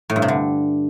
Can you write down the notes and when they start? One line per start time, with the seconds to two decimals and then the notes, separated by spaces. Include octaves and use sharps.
0.10 A2
0.16 G2
0.22 C3
0.28 D3